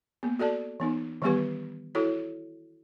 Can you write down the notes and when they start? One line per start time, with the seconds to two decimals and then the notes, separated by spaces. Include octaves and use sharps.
0.23 A#3 B3
0.39 F#4 A4 D5 A5
0.80 E3 B3 D#4
1.22 D#3 E3 G3 B3 G4 B4
1.95 E4 F#4 A4 C#5